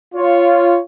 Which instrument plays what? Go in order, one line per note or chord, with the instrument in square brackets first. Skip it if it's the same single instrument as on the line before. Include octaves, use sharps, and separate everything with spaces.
[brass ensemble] F4 C#5